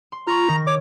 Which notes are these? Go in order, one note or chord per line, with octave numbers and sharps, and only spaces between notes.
C6
F4 A#5 B5 C#6 F6
D#3 A#6
C#5 D6